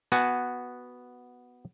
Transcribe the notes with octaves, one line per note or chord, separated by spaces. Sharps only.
B3 F#4 G#5